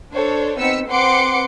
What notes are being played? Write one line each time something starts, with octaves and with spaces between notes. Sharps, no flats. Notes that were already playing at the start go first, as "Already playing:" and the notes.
D4 A4 C5 C#5
B3 C4 D#4 E6 B6 C#7
C4 B4 F#5 C6 D6 C#7